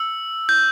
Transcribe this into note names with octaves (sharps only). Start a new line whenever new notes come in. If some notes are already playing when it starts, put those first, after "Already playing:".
Already playing: E6
G6